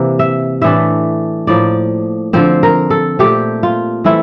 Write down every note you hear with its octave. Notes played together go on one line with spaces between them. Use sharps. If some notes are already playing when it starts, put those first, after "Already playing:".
Already playing: C3 E3 A#3
E5
A2 E3 A3 D4 E5
A2 F3 A#3 D5
D3 F3 C4 C5
A#4
A4
A#2 A3 C4 G4
F4
E3 A3 C4 E4